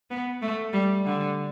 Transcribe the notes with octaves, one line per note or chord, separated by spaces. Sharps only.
B3
A3
G3
D3